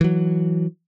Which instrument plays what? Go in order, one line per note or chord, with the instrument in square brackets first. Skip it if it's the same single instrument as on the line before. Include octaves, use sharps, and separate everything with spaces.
[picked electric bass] E3 F#3